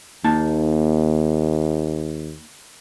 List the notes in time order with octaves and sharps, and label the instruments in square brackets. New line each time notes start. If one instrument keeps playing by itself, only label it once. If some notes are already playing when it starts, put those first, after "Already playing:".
[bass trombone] D#2 [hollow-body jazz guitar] A#3 D#4 A5